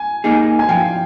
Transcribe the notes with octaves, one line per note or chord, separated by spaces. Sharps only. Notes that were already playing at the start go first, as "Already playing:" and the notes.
Already playing: G#5
A#3 D#4 G#4
G#5
F3 G5